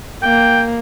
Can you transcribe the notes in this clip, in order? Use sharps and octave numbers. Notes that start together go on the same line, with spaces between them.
A#3 G5